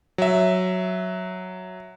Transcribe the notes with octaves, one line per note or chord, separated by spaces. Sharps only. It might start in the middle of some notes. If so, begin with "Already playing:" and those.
F#3 E5